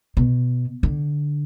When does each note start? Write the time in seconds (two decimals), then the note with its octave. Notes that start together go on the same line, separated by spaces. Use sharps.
0.17 B2
0.83 D3